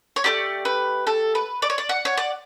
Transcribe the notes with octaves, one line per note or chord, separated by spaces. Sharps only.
C#5
A3 E4 G4 D5
B4
A4
B4
D5
C#5
D5
F#5
C#5
D5